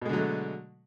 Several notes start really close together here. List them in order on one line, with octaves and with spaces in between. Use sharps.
B2 G#3 D3 F#3 A3